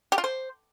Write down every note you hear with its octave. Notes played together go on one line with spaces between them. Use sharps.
G4
F4
C5